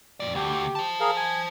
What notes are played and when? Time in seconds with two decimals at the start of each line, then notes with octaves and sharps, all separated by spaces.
0.20 F2 D5
0.35 D2 G4
0.75 C5 A5
1.00 G#4 A#4 F5
1.17 G#5